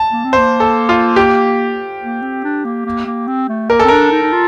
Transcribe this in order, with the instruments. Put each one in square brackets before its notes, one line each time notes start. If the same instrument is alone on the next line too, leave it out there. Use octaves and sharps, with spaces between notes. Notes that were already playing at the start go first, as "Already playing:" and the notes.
Already playing: [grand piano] A5
[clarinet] A#3
C4
[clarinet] A#3 [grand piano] C5
[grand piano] A4
F4
G4
[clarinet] A#3
C4
D4
A#3
A#3
A#3
C4
A3
[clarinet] A#3 [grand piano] A#4
[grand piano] A4
[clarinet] C4
[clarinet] D4 [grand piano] A#4
[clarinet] D#4
D#4
F4